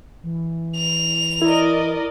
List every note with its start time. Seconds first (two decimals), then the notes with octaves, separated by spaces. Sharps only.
0.23 E3
0.76 F7
1.42 E4 A#4 D5 D#5